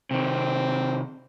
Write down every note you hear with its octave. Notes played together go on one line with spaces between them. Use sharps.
C3 D#3 C4